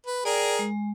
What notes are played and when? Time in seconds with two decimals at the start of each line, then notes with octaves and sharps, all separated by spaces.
0.07 B4
0.25 G#4 A#4 D5 G5
0.59 G#3